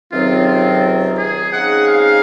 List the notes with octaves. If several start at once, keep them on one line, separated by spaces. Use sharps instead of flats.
C#2 C3 D#3 F#3 C4 F4
F4
G#4
C#3 G#3 C4 D#4 G#4 F#5
F5